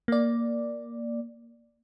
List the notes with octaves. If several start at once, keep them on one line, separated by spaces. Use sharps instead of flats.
A#3 D5